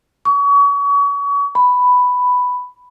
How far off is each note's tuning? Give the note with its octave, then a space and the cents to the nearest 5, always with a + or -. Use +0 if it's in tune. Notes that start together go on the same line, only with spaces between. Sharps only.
C#6 +35
B5 +5